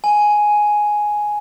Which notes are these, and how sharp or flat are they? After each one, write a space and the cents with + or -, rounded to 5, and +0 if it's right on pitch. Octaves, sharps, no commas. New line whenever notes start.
G#5 +5